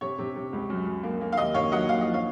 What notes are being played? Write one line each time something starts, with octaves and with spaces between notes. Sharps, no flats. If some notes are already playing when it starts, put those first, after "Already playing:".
C3 C#5
C3
C3
C#2
F#2
F#2
A#3
A#3
F5
D#2 D#5
D#2 C#5 F5
F#3 D#5 F#5
D#2 F5
F3 D#5
C#5 F5